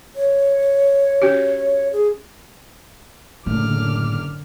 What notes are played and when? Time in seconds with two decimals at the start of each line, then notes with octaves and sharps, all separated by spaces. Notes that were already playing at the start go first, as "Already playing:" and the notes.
0.16 C#5
1.22 C#4 F#4 G4
1.93 G#4
3.46 F#1 F#2 A2 D3 D6 F6